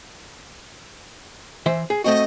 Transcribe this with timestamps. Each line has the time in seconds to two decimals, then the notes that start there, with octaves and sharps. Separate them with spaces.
1.66 E3 C5 E5
1.90 G#4
2.04 A3 C4 F#4 D#5